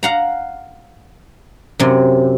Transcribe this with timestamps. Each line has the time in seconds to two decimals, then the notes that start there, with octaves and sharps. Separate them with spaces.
0.03 F5 F#5 A#5
1.79 F#2 C3